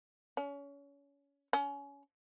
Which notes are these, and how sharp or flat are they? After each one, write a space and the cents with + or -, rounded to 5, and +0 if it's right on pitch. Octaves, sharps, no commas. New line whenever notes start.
C#4 +30
C#4 +25